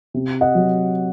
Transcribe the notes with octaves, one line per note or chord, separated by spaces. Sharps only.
C3
D#5 F#5
F#3